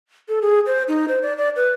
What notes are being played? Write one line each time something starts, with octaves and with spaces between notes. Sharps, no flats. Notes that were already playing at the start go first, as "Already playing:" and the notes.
A4
G#4
C5
D#4
C5
D5
D5
B4